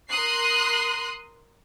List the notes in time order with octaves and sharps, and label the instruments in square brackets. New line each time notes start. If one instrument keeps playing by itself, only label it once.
[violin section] A#4 C6 D#6 F#6 C7